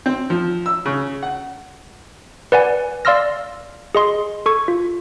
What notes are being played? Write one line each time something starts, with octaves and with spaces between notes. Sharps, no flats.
C4
F3
E6
C#3
F#5
B4 D5 F#5 G#5
D5 F5 C6 E6 F6 A#6
G#4 D#5 C6
A4 C#6 G#6
F4